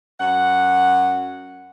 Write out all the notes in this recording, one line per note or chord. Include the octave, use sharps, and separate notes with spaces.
F#2 F#5